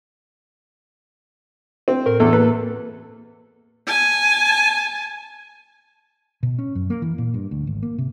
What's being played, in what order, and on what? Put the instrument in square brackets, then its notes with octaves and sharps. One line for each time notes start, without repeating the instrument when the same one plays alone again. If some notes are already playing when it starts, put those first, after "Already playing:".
[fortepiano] C4
[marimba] A2 [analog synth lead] A#4
[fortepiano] E2 [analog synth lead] A4
[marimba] A#3 [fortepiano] B4
[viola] G#5 A5
[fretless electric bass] B2
C#4
F#2
A#3
E3
A#2
G2
D2
G#1
A#3
C3